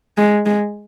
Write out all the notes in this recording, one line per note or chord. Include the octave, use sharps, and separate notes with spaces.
G#3
G#3